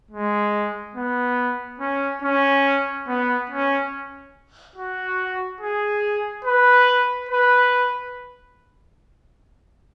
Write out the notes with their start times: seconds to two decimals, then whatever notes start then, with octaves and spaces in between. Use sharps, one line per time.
0.11 G#3
0.95 B3
1.80 C#4
2.22 C#4
3.07 B3
3.50 C#4
4.76 F#4
5.61 G#4
6.45 B4
7.29 B4